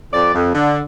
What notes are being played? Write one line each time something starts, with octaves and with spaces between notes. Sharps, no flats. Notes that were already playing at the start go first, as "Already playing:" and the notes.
F2 D5
F2
D3